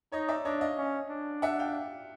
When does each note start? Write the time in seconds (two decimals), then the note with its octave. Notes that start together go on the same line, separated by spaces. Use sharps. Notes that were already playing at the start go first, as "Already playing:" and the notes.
0.12 D#4 C#5 D#5
0.28 D5 E5
0.45 D4 C#5 D#5
0.61 D#5 F5
0.78 C#4
1.10 D4
1.42 E5 F#5
1.59 F5 G5